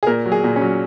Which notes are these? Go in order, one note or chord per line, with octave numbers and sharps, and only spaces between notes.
G#4
A#2 A#4
F#3
G#4
A#2
C#4
F#3